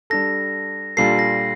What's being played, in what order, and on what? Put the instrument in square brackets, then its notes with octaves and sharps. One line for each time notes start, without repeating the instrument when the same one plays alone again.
[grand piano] G3 D4 A4 [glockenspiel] A#6
[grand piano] A#2 G3 D4 F4 A4 [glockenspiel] C7
[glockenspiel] A#6